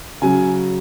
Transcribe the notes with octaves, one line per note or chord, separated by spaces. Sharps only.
C#3 F#3 G#5